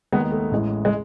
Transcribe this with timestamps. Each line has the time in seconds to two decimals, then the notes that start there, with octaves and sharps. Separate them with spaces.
0.12 D#2 D#3 G#3 B3
0.32 A3
0.51 A1 A2 E3 G#3
0.85 G#3